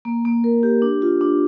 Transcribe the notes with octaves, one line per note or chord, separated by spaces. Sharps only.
A#3
A#3
A#4
G4
D4
F4
D4